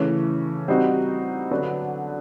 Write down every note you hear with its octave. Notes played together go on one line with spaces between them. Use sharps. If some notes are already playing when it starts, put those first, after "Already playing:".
Already playing: C#3 E3 A3 C#4
G3 C4 D#4 F#4
D3 F#3 B3 D4